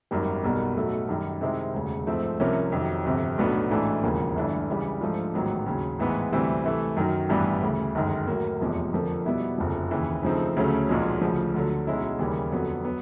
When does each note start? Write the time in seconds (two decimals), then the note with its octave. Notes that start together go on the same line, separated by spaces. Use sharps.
0.11 G#1 F#2 D#3 G3 A#3
0.44 B1 B2 G3 A#3
0.77 B1 A2 F#3 A3
1.09 F#2 D#3 G3
1.41 C3 D#3 G#3 C4 E4
1.74 E1 D2 C#3
2.07 G#2 F3 A3 C4
2.40 C2 C3 F3 A#3 C#4
2.72 F2 C3 D#3 F#3
3.05 G1 F2 C3
3.38 B1 A2 F#3 B3 D4
3.70 A1 G#2 E3 A3 D4
4.02 E1 D#2 C#3 F3 A#3
4.35 G1 G2 E3 A3 D4
4.68 C#2 C#3 E3 G3
5.01 G#2 F3 A3 D4 F4
5.34 A1 G#2 D#3 F#3 B3
5.66 D#2 C#3 F#3
5.99 A1 G#2 E3 G#3 B3
6.32 D2 C3 E3 G3 C4
6.64 C3 E3 A3
6.97 F#2 D#3 F#3
7.29 A1 G2 E3 G3 B3
7.62 D2 C#3 E3
7.95 G1 F#2 D#3 G#3
8.27 A2 F#3 A#3
8.60 F1 E2 C3 F3 G#3
8.93 F2 D3 F3 A#3
9.26 B2 G3 B3 E4
9.58 F#1 F2 D3 F3
9.91 D#2 C#3 E3
10.23 C#3 F3 A3 C4 D#4
10.57 D2 C#3 F#3 A3 C#4
10.89 B1 A#2 F3 G#3
11.21 D2 C#3 F3
11.54 D2 D3 F#3
11.87 B1 B2 G#3 C#4 E4
12.19 D#2 C#3 E3 G3 A#3
12.52 F2 D3 F#3 B3
12.85 F#3 B3